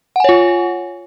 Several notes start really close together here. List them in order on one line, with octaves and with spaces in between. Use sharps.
F#5 G#5 C#5 F4